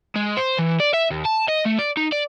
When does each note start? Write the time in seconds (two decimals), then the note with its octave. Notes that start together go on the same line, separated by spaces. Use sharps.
0.16 G#3
0.37 C5
0.59 E3
0.80 D5
0.94 E5
1.11 D#2
1.25 A5
1.49 D#5
1.66 A3
1.79 D5
1.97 D#4
2.12 D5